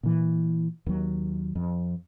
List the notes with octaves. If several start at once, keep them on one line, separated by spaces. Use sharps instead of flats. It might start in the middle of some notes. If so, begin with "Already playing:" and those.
A#2 E3
D#2 F#3
F2